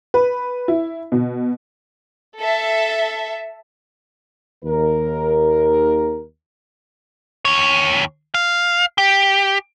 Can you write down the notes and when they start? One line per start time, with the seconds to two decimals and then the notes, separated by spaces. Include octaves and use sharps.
0.14 B4
0.68 E4
1.12 B2
2.41 A4 E5
4.64 D#2 A#4
7.45 D#2 C#5
8.34 F5
8.98 G4